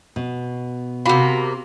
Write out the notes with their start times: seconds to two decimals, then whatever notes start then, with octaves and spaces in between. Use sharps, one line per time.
0.16 B2
1.06 C3 A#3 F#4 B5